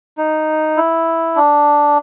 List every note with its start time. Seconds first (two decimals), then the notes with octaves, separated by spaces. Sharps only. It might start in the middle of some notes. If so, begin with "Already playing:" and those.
0.18 D#4
0.77 E4
1.36 D4